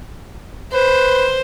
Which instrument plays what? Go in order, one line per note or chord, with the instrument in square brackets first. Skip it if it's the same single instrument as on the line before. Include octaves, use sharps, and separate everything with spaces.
[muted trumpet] B4 [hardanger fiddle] C5